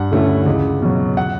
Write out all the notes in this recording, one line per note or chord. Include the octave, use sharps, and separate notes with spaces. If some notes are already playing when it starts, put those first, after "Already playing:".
Already playing: G2 F#5
D3 A3 C#4 E4
C#2
B2 F#3
F#5